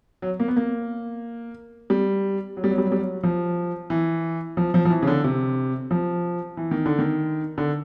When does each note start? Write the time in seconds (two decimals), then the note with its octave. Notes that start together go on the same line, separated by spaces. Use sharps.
0.22 F#3
0.40 A#3
0.48 B3
0.56 A#3
1.90 G3
2.57 F#3
2.64 G3
2.71 F#3
2.78 G3
2.85 F#3
2.92 G3
2.99 F#3
3.23 F3
3.90 E3
4.57 F3
4.74 F3
4.85 F3
4.90 E3
5.03 C#3
5.07 D3
5.24 C3
5.91 F3
6.57 E3
6.71 D#3
6.86 D3
6.99 D#3
7.58 D3